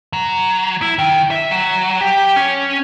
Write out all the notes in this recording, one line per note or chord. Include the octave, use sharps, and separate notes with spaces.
F#3
E4
D#3
E5
F#3
G4
C#4